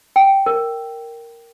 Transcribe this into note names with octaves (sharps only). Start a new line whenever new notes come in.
G5
A#4